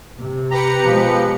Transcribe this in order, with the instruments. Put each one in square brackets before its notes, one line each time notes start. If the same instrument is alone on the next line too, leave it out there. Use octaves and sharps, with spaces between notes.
[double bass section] C3
[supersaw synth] G4 B4 C#7 [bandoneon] A#5
[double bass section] B2 G#3 [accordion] F3 [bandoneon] A#5